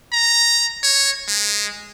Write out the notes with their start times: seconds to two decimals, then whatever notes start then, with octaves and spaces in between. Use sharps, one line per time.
0.12 A#5
0.83 C#5
1.28 G#3